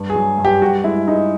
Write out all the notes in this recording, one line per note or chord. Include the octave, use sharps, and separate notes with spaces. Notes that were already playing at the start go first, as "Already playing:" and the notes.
Already playing: G2
G#4
F#3
G2
G4
G2 F#4
G#3 E4
G#3 D#4